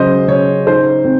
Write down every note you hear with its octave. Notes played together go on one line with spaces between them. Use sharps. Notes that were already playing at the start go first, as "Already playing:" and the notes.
Already playing: C#3 F#3 C5 D#5
C#3 C#5
D#4 C5
C4